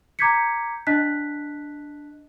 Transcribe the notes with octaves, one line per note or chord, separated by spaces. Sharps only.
A#5 D6 G6 G#6 B6 C#7
D4 D#5 A5 F#6 B6